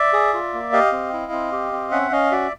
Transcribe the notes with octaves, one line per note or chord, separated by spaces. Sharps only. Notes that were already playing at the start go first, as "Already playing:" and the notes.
Already playing: D5 E5
G#4
F4
A#3
G4 D#5 F5
C4
E4
C4
G4
C4
C#4 E5 F#5
C#4 D#5 F5
F#4 D5 E5